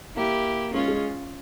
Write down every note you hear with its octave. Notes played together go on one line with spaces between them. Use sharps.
A#3 E4 G4 A#4
G#3 C#4 F4 G#4
G#3 G#4